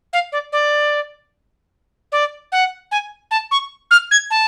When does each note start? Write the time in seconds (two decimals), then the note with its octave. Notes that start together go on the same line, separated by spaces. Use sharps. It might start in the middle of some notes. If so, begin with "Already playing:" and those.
0.13 F5
0.32 D5
0.52 D5
2.12 D5
2.52 F#5
2.92 G#5
3.31 A5
3.51 C#6
3.91 F6
4.11 G#6
4.31 A5